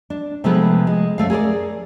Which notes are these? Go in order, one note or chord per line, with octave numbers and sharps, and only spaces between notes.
D4
C3 F3 G#3 A3 B3 B4
G#3
F#2 F#3 A3 F5
G#4 A#4 C5 D5